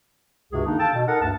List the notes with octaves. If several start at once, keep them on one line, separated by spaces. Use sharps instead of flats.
C#2 G2 C3 F#4 G#4
D#3 A#3 D4 D#4
A4 F5 G5 A5
B2
D#4 A4 A#4 F#5
D2 G2 A5